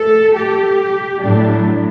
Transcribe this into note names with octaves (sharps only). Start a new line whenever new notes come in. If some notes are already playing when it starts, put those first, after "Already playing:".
Already playing: A3 A4
G4
A2 F#3 A3 D4